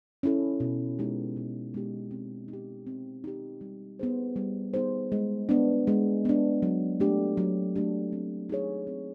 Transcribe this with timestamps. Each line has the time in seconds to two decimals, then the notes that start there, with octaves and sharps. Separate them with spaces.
0.23 C#4 E4 A4
0.60 B2
0.99 G#3 B3 D#4 G4
1.36 B2
1.74 G#3 B3 D#4 G4
2.11 C4
2.48 D#4
2.53 G4
2.87 C4
3.24 D#4 G4
3.61 G3
3.99 B3 D#4 G#4 C5
4.36 G3
4.74 B3 D#4 G#4 C5
5.12 G#3
5.49 B3 D4
5.87 G#3
6.25 B3 D4
6.62 F#3
7.00 A3 D4 G4
7.37 F#3
7.75 A3 D4 G4
8.12 C4
8.49 D#4 G#4 C#5
8.87 C4